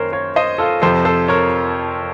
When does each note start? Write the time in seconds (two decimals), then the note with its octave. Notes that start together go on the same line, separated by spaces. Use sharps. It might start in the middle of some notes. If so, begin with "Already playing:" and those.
Already playing: F#2 D#3 A#3 A#4 C5 C#5
0.12 A#4 C#5
0.36 C5 D#5
0.58 F4 A4
0.82 F2 C3 F3 A4 C5
1.05 A4 C5
1.28 A#4 C#5